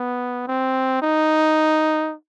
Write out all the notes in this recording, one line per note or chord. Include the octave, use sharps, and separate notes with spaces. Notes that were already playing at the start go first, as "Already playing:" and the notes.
Already playing: B3
C4
D#4